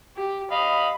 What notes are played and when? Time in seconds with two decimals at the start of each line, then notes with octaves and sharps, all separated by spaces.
0.17 G4
0.51 D#5 F5 B5